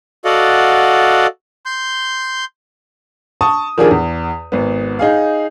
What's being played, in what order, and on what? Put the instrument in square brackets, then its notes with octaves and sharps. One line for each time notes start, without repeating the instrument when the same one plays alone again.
[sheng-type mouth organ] F#4 A4 D5 D#5 F5 F#5
C6 G6
[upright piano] A5 C#6 D#6
D#3 F3 D4 G4 G#4 A#4
E2
G#1 B3
D#4 G#4 F5